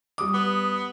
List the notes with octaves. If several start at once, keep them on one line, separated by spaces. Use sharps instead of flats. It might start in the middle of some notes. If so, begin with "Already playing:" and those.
G3 D6 D#6
B3